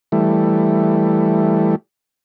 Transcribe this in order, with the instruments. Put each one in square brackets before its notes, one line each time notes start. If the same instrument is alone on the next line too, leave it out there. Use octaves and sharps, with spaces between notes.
[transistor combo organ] E3 G3 A3